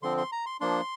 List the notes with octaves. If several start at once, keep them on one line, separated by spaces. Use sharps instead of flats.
D3 F3 C4 C6
C6
A#5
C6
F3 A#3 D4 C6